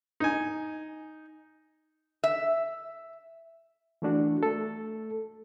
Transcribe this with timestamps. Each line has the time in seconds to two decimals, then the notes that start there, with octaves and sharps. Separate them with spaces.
0.20 D#4 G#5
2.24 E5
4.02 E3 A3 D4 F#4
4.43 A3 A4